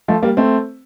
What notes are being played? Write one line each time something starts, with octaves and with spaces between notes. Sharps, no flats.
F3 A3
G3 A#3
A3 C4